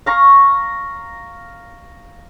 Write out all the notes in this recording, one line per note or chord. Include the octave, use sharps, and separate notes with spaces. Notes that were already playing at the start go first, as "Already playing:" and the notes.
F5 A#5 C#6